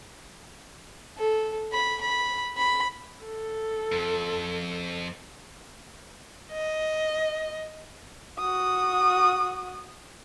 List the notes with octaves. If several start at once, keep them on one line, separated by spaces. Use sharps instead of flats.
A4
B5
B5
B5
A4
F2
D#5
F#4 D#6